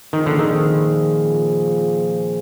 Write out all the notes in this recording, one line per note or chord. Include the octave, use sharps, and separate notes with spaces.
A#2 D#3 F3 C4 F4 G#4
D3
D#3